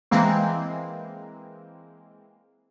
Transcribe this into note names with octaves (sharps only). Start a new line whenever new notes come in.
E3 G#3 A#3 C4